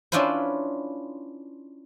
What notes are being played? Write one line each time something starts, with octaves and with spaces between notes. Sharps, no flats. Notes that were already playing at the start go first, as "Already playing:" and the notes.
C#4 D4 E4 F4 B4 C5